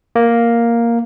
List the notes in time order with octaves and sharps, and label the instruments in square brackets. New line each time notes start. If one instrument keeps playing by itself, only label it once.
[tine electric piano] A#3